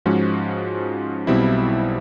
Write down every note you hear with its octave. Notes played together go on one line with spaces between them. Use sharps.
G#2 F3 G#3 C#4 F#4
B1 B2 G3 C4 E4